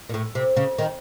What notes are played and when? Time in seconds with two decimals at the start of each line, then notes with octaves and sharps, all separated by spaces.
0.09 A#2
0.14 A2
0.35 C3
0.57 C#3
0.78 D#3